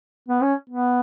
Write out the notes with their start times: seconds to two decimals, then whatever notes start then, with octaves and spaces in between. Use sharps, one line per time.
0.28 B3
0.41 C#4
0.69 B3